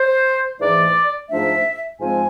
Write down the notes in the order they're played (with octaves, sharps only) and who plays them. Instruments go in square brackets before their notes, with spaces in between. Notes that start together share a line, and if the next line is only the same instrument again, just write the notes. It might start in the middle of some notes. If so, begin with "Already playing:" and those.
Already playing: [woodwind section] C5
G#2 E3 A3 D5
G#2 F3 A3 D4 E5
G#2 F3 G#3 C4 G#5